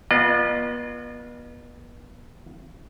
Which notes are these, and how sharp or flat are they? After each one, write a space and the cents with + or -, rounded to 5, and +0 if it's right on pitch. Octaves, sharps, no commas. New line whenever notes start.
B3 -35 F4 +0 D#5 -45